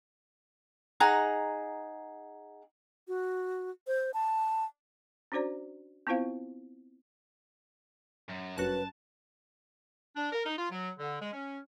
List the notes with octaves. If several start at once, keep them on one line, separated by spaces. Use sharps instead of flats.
D#4 G#4 F#5 A#5
F#4
C5
A5
C#4 D4 F#4 C5 D5
B3 C4 E4 F4 C5 F5
F#2
G1 F#2 F#4 B4 A5 F#6
D4
A#4
D#4
F4
F#3
D3
G#3
C#4